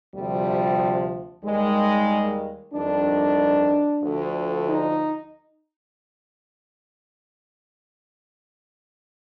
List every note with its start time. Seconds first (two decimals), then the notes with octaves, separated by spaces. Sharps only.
0.14 D2 C3 F3 G3
1.44 D#2 D#3 G3 G#3
2.74 F2 D#3 G3 D4
4.03 D2 D3 F3
4.68 D#4